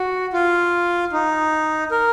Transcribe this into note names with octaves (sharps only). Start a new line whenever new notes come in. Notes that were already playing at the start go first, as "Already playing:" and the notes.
Already playing: F#4
F4
D#4
A#4